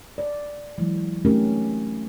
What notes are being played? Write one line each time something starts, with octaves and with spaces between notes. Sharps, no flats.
D5
E3 F#3 G#3
A3 C4 C#4 D#4 G4 A#4